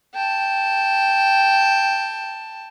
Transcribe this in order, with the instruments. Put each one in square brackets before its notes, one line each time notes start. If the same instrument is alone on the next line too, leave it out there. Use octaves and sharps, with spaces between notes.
[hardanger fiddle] G5 A5